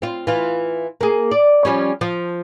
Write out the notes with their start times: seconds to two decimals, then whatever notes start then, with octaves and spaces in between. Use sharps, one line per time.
0.02 C4 F4
0.27 E3 F4
1.01 A#3 G#4
1.31 D5
1.65 F3 G3 C#4
2.01 F3